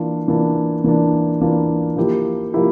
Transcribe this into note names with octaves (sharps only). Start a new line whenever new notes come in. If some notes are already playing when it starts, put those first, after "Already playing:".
Already playing: E3 A#3 D4 F4
E3 A#3 D4 F4
E3 A#3 D4 F4
E3 A#3 D4 F4
F3 A#3 E4 G4
F3 A#3 E4 G4